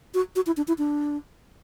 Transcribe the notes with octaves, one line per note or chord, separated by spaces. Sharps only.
F#4
F#4
E4
D4
E4
D4